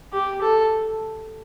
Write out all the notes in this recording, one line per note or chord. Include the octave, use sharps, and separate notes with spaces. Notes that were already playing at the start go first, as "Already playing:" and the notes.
G4
A4